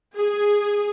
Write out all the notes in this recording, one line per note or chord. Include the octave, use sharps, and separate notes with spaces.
G#4